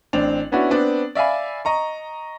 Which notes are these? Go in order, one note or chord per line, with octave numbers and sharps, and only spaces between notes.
A1 C4 D4 F7
B3 C#4 D4 E4 F#4
B3 C4 D4
D5 E5 F5 G#5 B5
D#5 A#5 C#6